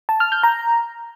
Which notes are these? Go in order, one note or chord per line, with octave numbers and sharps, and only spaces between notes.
A5
F6
G6
A#5